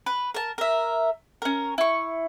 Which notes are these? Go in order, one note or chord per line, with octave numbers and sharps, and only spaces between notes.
B4
A#4 A5
A#4 E5
C#4 A#4
E4 C#6